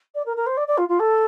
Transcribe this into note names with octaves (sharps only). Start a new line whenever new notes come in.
D5
A#4
A#4
C5
D5
D5
F4
F4
A4